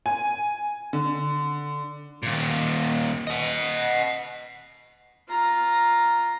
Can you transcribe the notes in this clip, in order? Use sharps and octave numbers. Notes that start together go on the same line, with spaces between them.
G#5
D3
D#2 A#2
D#5 F#5
F4 A#5